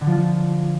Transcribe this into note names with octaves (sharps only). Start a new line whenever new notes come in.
D3
F3
F4
F3